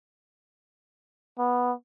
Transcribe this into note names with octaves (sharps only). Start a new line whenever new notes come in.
B3